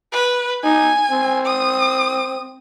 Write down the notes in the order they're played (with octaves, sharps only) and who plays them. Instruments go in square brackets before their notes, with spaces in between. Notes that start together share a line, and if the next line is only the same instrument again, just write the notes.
[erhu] B4
[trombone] D#4 [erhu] G#5
[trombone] C4
[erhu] D#6